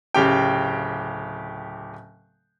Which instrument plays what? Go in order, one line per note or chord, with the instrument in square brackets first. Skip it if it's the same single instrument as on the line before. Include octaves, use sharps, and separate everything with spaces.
[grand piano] D1 C#3 G4 G5